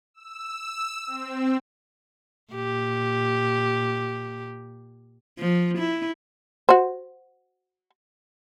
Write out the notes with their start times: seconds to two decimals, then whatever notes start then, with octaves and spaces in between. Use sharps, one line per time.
0.14 E6
0.58 E6
1.07 C4
2.53 A#2 G4
5.39 F3
5.78 E4
6.69 F#4 C5